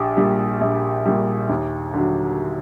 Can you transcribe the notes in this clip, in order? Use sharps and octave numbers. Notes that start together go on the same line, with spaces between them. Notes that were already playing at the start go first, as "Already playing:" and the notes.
Already playing: A#1 G4
A#2 G3
A#1
A#2 G3
D#2
D3 F#3